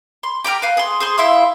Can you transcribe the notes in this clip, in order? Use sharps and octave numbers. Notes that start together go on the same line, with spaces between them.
C6
G4 G5 A#5 F6
B4 F5
G#4 C6
G#4 C5 C6
E4 E5 F5 C6